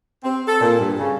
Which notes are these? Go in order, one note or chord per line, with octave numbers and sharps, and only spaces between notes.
C4
A4
A#2
G2
C#3